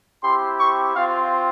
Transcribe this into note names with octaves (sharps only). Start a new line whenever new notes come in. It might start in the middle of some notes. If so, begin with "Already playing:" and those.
C4 E4 G4 C6
C#6
C4 F4 F5